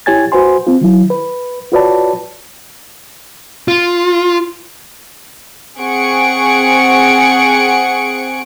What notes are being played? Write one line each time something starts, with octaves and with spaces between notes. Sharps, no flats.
E4 G4 C#5 G#5 G#6 A6
F#4 B4 C5 G#5 C6
C4 F4
D#3 F#3 E4
B4
F4 F#4 B4 C#5 D5 A5
F4
C4 G#4 F#5 C#6 C#7 D7